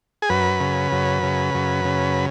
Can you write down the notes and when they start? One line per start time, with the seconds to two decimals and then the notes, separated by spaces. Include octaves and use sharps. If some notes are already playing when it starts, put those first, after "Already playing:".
0.22 G#4
0.30 F#2 B4
0.60 C#3
0.92 F#2
1.23 C#3
1.54 F#2
1.85 C#3